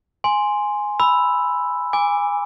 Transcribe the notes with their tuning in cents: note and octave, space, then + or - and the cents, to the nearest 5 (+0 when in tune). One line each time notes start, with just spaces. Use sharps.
G#5 +0 C6 +0
B5 +0 E6 +0
G#5 -20 D6 +0